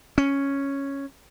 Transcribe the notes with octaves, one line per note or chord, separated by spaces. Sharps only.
C#4